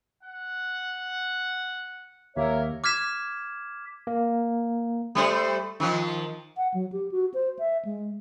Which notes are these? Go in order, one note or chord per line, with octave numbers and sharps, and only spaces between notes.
F#5
D#2 A#3 A#4 C#5 E5
D6 F6 G#6 B6 E7
A#3
G3 A3 C5
D#3 F3
F#5
F#3
G4
F#4
C5
E5
G#3